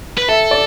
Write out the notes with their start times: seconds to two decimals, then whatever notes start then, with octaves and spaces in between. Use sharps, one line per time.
0.17 B4
0.28 A4 E5
0.51 D5